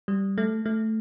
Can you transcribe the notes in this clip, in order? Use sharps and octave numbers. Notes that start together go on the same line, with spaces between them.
G3
A3
A3